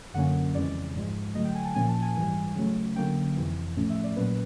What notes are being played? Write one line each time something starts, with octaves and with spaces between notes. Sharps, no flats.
F#2 D3 F#3 A#3 C#4 F#5
F2 C#3 E3 G#3 C#4 D5
G#2 F3 G#3
D3 F#3 A3 D#5
G5
G#5
A5
A#2 F3 A#3 C#4 G#5
A5
G#5
G#2 E3 G3 G#5
C#3 F#3 A3 C#4
D3 F#3 A#3 C#4 G5
F2 C3 E3
A2 F3 A3 C#4
E5
D5
A#2 F#3 A#3 C#4 B4